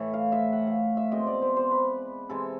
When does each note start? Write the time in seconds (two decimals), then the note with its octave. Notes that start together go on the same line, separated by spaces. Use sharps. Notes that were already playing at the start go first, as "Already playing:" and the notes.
Already playing: A2 E3 A3
0.14 F5
0.32 E5
0.53 F#5
0.67 F5
0.97 E5
1.12 B2 G#3 C4 D#5
1.27 D5
1.42 C5
1.56 C5
1.71 B4
2.30 C3 E3 G#3 A4